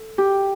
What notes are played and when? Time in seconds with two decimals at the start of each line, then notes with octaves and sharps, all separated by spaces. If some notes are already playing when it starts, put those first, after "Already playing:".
Already playing: A4
0.18 G4